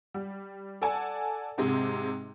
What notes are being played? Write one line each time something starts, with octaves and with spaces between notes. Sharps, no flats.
G3
A4 D5 F#5 G#5 A5
G#2 C3 G#3 D#4